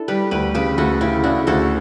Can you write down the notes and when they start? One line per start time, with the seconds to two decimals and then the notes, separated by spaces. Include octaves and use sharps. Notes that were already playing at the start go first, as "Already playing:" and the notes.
Already playing: D4 E4 A4
0.08 G3 G4 B4
0.31 D2 G4 B4
0.54 C#3 G4 B4
0.78 D2 F#4 A4
1.01 C#3 E4 G4
1.24 C#3 D4 F#4
1.47 D2 F#4 A4